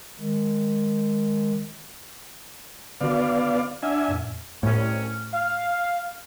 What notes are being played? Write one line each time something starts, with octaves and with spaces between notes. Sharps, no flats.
D#3 G#3
D3 D#3 B3 F#4 D5 F5
D4 E5 F#5 G#5 F6
F2 A#2
C2 A2 C#4
F5